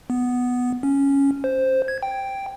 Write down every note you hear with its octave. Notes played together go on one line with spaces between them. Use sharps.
B3
C#4
C5
G#6
G5